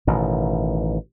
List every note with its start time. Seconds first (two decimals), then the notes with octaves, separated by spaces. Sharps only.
0.07 A1 B2 D#3